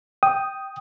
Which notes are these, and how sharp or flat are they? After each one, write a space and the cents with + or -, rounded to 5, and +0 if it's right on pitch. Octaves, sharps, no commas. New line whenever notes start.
G5 +0 D#6 +0